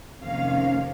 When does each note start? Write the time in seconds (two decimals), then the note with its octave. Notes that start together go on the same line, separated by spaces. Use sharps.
0.22 F2 C3 D#3 A#3 C#4 F5